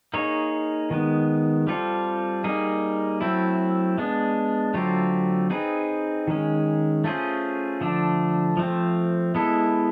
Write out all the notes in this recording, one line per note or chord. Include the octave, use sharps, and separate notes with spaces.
A#3 D#4 G#4 C#5
D#3 G#3 B3
G3 C4 F4 A4
G3 A#3 D#4 G#4
F#3 A3 C4 E4
G#3 B3 D4
D3 F#3 A3 C4 F4
C4 D#4 G#4 B4
D#3 G#3 C#4
A3 C#4 F4 G#4 C5
D3 F3 A3 D4
F3 A3 C4
G#3 B3 E4 A4